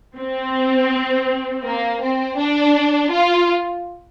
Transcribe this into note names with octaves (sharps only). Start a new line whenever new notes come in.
C4
A#3
C4
D4
F4